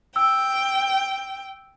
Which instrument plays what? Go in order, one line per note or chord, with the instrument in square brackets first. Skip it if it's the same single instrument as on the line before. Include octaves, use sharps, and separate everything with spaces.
[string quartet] G5 [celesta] E6